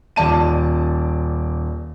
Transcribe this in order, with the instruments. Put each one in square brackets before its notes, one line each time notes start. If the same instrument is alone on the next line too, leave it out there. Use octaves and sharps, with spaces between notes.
[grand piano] D#1 D5 A5 D#7